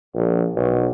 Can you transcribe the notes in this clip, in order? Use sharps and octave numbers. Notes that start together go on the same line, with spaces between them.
A#1
B1